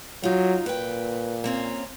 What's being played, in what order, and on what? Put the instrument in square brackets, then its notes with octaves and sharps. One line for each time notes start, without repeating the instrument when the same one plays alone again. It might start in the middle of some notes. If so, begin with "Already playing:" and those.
[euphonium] F#3 [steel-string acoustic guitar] D#4 F4
[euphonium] A#2 [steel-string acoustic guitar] B4 G5
[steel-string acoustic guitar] A#3 C4 C#4